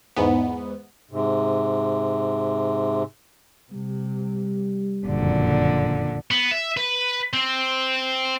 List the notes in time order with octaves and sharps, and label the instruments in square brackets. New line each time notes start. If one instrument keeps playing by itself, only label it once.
[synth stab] E2 G#2 B3
[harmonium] G#2 C3
[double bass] C3 [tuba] G3
[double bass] F#1 F2 [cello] A#2 D3
[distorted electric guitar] B3
E5
B4
C4